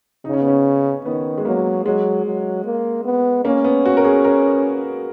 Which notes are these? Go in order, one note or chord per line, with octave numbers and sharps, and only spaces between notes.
C#3 D#4
C#4
B3
C#4
D#3 B3
G#3
F#3 A#3
F#3 G#3
F#3
A#3
B3
A#3 C#4
B3
F#4
A#4
G#4
A#4